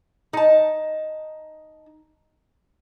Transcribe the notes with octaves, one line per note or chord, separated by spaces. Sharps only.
D#4 A5